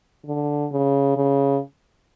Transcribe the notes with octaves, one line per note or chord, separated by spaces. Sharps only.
D3
C#3
C#3